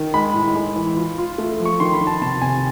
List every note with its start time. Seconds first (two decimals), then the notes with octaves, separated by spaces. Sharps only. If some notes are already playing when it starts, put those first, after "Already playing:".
Already playing: D#3
0.14 G#3 B5
0.34 A2
0.55 G#3
0.76 E3
0.96 F4
1.18 F4
1.38 A3
1.59 F3
1.65 C#6
1.80 D#3 C6
1.93 B5
2.01 D#3
2.07 A5
2.22 C3 A5
2.42 C3 G#5